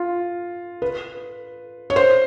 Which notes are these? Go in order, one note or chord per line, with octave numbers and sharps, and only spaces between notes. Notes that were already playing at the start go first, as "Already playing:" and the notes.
Already playing: F4
B4
C#5
C5